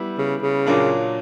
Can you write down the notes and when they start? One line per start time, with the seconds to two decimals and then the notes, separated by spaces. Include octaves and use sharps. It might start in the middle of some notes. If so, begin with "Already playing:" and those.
Already playing: G3 B3 E4
0.18 C#3
0.42 C#3
0.66 A#2 F#3 A#3 D4 F4